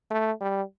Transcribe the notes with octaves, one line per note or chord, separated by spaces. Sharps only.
A3
G3